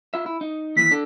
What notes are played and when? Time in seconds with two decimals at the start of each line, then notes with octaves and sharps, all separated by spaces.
0.14 F4 E5
0.26 E4
0.41 D#4
0.76 D#2 E3 B6
0.91 D4 A4